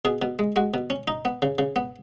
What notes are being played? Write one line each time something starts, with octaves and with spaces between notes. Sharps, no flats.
B2 G#4
B2
G#3
G#3 F#4
B2
C#4
D#4
B3
C#3
C#3
B3